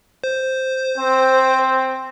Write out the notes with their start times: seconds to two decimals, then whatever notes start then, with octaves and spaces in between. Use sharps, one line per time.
0.24 C5
0.97 C4